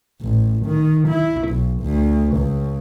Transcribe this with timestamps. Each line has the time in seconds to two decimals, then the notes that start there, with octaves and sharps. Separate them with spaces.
0.22 A1
0.66 D#3
1.08 E4
1.49 B1
1.82 D2
2.36 C#2